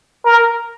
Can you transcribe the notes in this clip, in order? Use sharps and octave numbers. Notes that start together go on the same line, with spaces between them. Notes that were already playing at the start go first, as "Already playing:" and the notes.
A#4